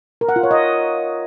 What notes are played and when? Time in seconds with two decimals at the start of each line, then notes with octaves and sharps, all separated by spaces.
0.21 A#4
0.29 F#5
0.36 F4
0.43 C#5
0.51 D#5